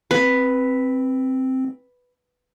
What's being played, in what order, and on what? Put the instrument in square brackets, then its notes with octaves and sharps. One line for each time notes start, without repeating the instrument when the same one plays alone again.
[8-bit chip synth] C4 [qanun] B4